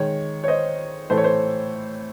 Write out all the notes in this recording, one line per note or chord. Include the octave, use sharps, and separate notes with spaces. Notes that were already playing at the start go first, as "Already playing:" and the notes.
Already playing: D#3 G#3 C#5
C#5
C5 D#5
A2 E3 A3 C5
C#5
C5